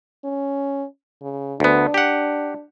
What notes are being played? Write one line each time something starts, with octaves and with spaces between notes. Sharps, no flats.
C#4
C#3
D2 B3 D4
G4 F#5